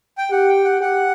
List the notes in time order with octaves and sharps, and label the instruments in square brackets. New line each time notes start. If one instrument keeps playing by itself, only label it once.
[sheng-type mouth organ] G5
[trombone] G4 [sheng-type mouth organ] F#5
[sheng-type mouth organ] G5
F#5
[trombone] G4 [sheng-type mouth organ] F#5